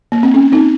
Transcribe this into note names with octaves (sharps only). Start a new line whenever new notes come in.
A#3
C4
C#4
C4 D#4